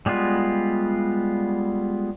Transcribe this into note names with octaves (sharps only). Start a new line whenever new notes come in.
G3 G#3 B3 F4